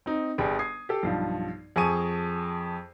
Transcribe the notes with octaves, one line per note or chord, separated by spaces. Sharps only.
C4 D#4
G1 G3 G#4 G5
D#6 G#6 C7
G4 A4
B1 G2 F3
F2 G#4 G#5 A5 C#6 D#7